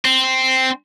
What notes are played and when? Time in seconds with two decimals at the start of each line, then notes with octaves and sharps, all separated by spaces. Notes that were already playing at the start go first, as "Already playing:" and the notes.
0.05 C4